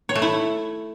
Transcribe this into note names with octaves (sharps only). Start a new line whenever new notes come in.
C#5
A3
E4